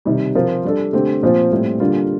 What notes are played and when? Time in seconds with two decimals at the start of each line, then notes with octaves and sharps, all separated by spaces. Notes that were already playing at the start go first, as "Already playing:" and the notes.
0.05 C3 D#3 G3
0.35 F3 C4 F4 A#4
0.64 G3 D4 A4
0.93 D3 A3 C4 G4
1.22 A#2 F3 C4 F4
1.52 A2 G3 C4
1.80 D3 G3 A#3 F4